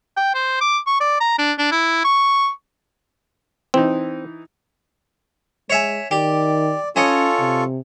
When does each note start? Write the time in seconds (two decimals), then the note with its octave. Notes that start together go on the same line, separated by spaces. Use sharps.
0.17 G5
0.34 C5
0.61 D6
0.87 C#6
1.01 D5
1.20 A#5
1.39 D4
1.58 D4
1.72 E4
2.04 C#6
3.74 E3 C4 D#4
5.70 G#3 C#5 E5 G#5
6.11 D#3 G4 D5
6.96 C#4 F4 A4 C#5 D#5 G#5 C#6
7.40 C3